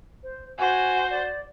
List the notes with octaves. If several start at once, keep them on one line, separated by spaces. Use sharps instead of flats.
C5
F#4 C5 G#5
D5